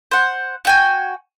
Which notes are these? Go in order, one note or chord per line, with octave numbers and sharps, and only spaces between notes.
C5 F#5
F#4 G5 G#5